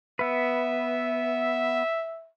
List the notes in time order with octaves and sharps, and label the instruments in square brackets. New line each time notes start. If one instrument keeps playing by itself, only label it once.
[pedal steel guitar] B3 B4 [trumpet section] E5